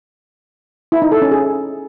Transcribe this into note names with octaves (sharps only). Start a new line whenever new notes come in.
E4
D#4
A4
C#4
G#4